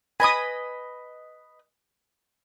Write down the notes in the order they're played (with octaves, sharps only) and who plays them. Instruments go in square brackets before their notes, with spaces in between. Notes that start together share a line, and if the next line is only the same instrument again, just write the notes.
[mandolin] B4 D#5 B5 [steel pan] G#5 D#6